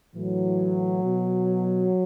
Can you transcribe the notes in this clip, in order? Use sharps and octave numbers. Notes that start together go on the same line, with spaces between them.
A2 E3 F#3
B2